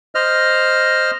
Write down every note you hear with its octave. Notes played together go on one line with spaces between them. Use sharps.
C5 D#5 F6